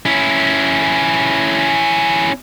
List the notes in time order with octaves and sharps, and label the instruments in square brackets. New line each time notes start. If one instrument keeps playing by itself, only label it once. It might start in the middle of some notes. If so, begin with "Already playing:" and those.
[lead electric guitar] C#4 E4